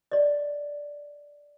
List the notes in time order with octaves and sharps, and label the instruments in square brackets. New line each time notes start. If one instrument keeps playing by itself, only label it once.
[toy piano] D5 D#5